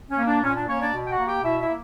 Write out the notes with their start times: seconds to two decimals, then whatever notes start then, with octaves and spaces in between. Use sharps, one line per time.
0.10 C#4
0.17 A#3
0.26 D4
0.42 A#2 C#4
0.55 D4
0.67 A#3 C#4 C#5
0.80 D4 D5
0.93 B2
1.05 G5
1.10 F#4 F#5
1.18 A#3
1.25 G4 G5
1.43 B2 E4 E5
1.60 E4 E5
1.68 A#3